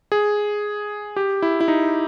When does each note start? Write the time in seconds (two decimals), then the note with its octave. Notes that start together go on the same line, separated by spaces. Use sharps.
0.12 G#4
1.16 G4
1.42 E4
1.61 E4
1.68 D#4